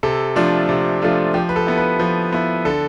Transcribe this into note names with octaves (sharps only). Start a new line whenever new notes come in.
C3 A4
F3 A3 D4 F4
C3
F3 A3 D4 F4
F3 G4
B4
A4
B3 E4
B4
F3
B3 E4
D3 A4